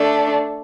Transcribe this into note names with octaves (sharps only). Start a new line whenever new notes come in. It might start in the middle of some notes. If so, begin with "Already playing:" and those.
Already playing: A3 D4